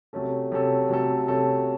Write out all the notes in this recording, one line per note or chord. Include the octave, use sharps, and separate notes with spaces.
C3 F#3 A3 C#4 A4
C3 F#3 A3 C#4 A4
C3 F#3 A3 C#4 A4
C3 F#3 A3 C#4 A4